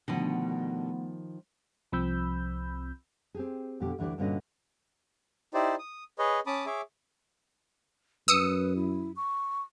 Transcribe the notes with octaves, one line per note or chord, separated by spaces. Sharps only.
B2 D3 D#3 F3 A3 B3 F#5
C2 F3 C4 B5 E6 G6
C4 G4 G#4
F2 B2 D3 G4
D2 E3 D4 G4 D5
G2 A#2 D3 C#4 F#4 D#5
D#4 E4 G4 C5 D5
D#6
G#4 B4 C#5 D#5
C#4 A5 B5 D6 D#6
G#4 C#5 E5 D6
F#2 B4 D#6 E6 C#7
E4
C#6